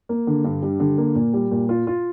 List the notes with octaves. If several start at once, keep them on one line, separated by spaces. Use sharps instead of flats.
A#3
D3
G2
G3
D3
A#3
A#2
G3
A#2
F4
F4